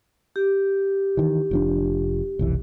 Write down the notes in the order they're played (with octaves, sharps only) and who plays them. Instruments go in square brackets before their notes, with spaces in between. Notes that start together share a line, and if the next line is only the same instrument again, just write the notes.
[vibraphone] G4
[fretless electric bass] D#3 E3
F1 F3 D4
F1 B1 E3